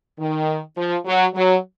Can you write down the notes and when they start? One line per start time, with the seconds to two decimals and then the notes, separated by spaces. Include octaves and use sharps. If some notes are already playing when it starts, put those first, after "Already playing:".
0.19 D#3
0.76 F3
1.05 F#3
1.35 F#3